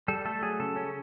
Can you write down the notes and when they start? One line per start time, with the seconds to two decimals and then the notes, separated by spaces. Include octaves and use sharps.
0.08 G3 A4
0.25 A3 A4
0.42 F#3 G#4
0.60 C#3 A4
0.76 C#4